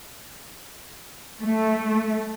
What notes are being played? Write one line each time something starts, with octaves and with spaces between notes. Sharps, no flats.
A3